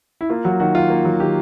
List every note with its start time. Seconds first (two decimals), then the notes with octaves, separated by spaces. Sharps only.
0.21 E4
0.30 A#3 F4
0.45 F#3 F#4
0.60 D#3 F#4
0.75 D#3 F4
0.90 A#3
1.05 F#3
1.20 D#3 G4